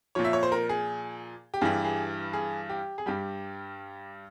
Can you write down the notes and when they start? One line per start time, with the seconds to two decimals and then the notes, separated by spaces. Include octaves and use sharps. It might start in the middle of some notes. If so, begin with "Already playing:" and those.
0.15 A#2 F3 C#5
0.25 E5
0.33 C#5
0.43 C5
0.52 A#4
0.69 G#4
1.54 G4
1.61 G2 E3 G3 G#4
1.85 G#4
2.33 G#4
2.70 G4
2.98 G#4
3.06 G2 G3 G4